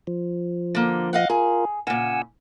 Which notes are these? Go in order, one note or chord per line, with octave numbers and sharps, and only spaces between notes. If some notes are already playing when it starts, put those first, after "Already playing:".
F3
D3 A#3
D#5 F5 F#5
F4 G#4 A#4
A#2 C#3 F#5 G#5 E6